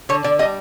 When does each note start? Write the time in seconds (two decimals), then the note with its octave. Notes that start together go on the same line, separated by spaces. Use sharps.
0.09 D3 C#5
0.24 D3 D5
0.39 G3 D#5